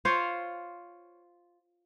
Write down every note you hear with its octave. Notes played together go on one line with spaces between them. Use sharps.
F4 C5 C#5 F5